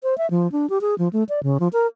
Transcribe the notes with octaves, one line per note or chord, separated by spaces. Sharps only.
C5
E5
F3
D4
G4
G#4
F3
A3
D5
C#3
F3
A#4